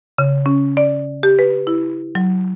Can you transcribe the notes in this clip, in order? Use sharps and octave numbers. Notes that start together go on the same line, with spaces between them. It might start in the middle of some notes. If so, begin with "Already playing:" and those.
C#3
C#4
D5
G4
B4
E4
F#3